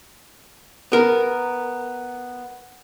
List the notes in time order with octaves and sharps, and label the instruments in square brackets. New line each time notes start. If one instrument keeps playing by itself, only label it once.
[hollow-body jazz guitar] B3 A#4